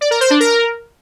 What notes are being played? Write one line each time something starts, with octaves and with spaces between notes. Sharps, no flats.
D5
A#4
C5
D4
A#4